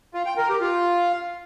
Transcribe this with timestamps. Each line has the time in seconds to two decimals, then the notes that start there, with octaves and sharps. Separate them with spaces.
0.14 F4
0.26 G5
0.38 A#4
0.49 G4
0.61 F4